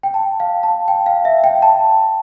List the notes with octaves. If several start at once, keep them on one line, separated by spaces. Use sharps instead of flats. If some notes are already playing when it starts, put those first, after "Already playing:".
G5
A5
F5
A5
G5
F5
E5
G5
A5